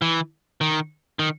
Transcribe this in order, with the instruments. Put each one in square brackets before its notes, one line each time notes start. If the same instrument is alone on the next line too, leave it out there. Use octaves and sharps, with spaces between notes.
[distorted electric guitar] E3
D#3
D#3